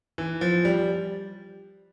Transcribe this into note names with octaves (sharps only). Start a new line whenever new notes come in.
E3
F3
G3